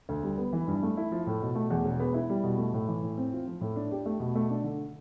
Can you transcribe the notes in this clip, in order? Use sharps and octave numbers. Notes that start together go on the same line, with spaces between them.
D2
G3
B3
E3
G2
A3
E4
F3
A2
B2
A3
E2
E1
B3
E4
G3
B2
A3
A2
E3
A2
C4
F4
F3
A2
D4
G4
A3
B2
A3
D4
D3